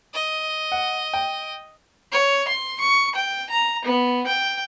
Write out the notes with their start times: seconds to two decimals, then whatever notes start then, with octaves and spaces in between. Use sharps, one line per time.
0.14 D#5
0.72 F#5
1.13 G5
2.12 C#5
2.48 C6
2.81 C#6
3.15 G5
3.50 A#5
3.85 B3
4.27 G5